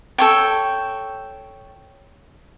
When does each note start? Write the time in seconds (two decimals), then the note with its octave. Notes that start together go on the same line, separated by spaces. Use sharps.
0.18 A4 C#5 G5